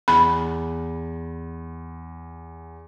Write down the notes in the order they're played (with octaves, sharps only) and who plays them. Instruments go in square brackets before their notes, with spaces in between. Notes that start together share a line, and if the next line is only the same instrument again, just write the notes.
[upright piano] E2 [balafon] B5